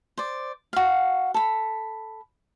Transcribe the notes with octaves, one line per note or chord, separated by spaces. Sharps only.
C5 D5
F#4 F5
A4 B5